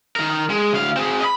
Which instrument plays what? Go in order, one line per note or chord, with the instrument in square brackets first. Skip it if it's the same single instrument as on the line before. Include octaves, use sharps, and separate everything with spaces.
[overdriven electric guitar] D#3 A#4
G#3
D2 F5
C4 G#4
D#5 B5